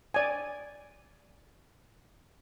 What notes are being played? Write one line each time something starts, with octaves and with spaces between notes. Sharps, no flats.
D5 G#5